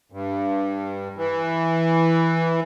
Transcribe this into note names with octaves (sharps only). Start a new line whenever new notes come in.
G2
E3